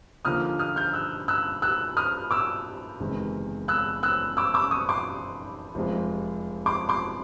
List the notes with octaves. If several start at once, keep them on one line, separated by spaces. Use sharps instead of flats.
D#2 D3 F3 A#3 D#6 F6
D#6 F6
F6 G6
E6 F#6
E6 F#6
E6 F#6
D#6 F6
D6 E6
F#1 E2 C3 D#3 G#3
E6 F#6
E6 F#6
D6 E6
D6 E6
C#6 D#6
C6 D6
F1 F2 C3 F3 G#3
C6 D6
C6 D6